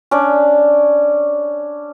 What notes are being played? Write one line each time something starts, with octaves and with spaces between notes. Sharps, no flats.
C#4 D4 D5